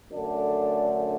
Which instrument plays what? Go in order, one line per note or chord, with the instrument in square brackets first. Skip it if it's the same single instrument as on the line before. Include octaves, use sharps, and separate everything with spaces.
[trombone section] F#2 D3 A3 D4